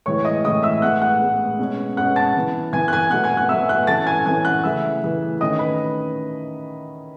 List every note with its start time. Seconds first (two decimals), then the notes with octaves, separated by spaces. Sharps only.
0.06 A2 E3 G#3 C#5 C#6
0.25 D#5 D#6
0.45 A2 E3 G#3 D#5 D#6
0.63 E5 E6
0.82 A2 G#3 B3 F#5 F#6
1.02 F#5 F#6
1.21 A2 G#3 B3
1.59 B2 G#3 C#4
1.97 B2 G#3 C#4 F#5 F#6
2.16 A5 A6
2.35 E3 B3
2.73 E3 B3 G#5 G#6
2.88 F#6
2.93 G#5 G#6
3.11 B2 F#3 A3 F#5 F#6
3.24 G#5 G#6
3.37 F#5 F#6
3.49 B2 F#3 A3 E5 E6
3.69 F#5 F#6
3.87 A2 E3 A3 C#4 A5 A6
4.07 G#5 G#6
4.25 A2 E3 A3 C#4 G#5 G#6
4.45 F#5 F#6
4.63 C#3 E3 A3 E5 E6
5.02 C#3 E3 A3
5.41 D#3 A3 C#4 D#5 D#6
5.59 B4 B5